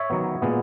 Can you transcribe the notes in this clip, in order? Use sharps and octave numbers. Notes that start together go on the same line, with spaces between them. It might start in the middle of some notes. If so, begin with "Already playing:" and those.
Already playing: C#5 E5
D#3 F#3 B3
A#2 G#3 B3